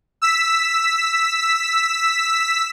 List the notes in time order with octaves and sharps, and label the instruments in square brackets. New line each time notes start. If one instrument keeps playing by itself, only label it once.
[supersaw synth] E6 B6